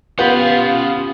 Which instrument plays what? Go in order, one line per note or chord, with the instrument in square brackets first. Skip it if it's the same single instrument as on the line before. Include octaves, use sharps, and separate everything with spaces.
[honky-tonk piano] B3 [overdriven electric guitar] C#4 B5 [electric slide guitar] F4 [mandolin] G4